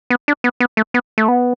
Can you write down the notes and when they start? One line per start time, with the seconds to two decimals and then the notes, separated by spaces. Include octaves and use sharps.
0.10 B3
0.28 D4
0.44 B3
0.60 B3
0.77 A3
0.94 B3
1.18 A3
1.28 B3